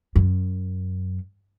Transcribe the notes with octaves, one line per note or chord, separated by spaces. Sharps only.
F#2